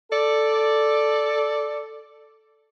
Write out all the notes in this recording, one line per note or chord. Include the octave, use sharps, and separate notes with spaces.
A4 D5